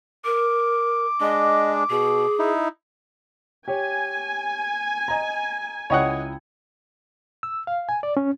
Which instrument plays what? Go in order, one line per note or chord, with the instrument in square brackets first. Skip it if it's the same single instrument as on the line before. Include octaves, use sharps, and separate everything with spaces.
[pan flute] A#4 [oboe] D6
[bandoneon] G#3 D4 [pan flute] D#5
[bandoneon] B2 [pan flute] G#4
[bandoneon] D#4 E4
[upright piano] G4 C#5 [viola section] G#5
[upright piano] D#5 A#5
[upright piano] C#2 E4 G5 [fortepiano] C#5 D#5 F#5
[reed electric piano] E6
F5
G#5
D5
C#4